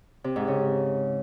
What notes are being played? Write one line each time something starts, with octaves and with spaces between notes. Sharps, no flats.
C3
G#2
C#3